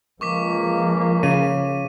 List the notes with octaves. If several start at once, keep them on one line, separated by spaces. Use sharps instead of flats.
C#2 F3 G#3 A#3 C#6 D6 B6
C#3 D#7